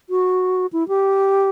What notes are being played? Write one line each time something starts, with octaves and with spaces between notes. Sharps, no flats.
F#4
E4
G4